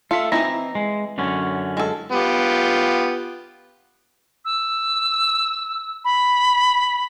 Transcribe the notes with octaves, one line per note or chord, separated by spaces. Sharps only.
F4 A4 E5
E3 C4 D#4 E4 A#5
G#3
F#2 D3 C#4
G#3 A4
B3 F4 G4
E6
B5